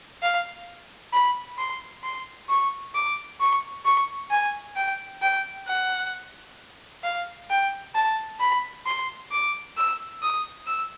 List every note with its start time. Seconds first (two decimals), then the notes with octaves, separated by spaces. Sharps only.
0.22 F5
1.13 B5
1.58 C6
2.03 C6
2.49 C#6
2.94 D6
3.41 C#6
3.85 C#6
4.31 G#5
4.76 G5
5.22 G5
5.68 F#5
7.03 F5
7.50 G5
7.95 A5
8.40 B5
8.86 C6
9.31 D6
9.77 E6
10.22 D#6
10.67 E6